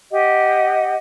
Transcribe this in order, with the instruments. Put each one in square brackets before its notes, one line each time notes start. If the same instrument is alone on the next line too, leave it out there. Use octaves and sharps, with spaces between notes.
[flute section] G4 D#5 F#5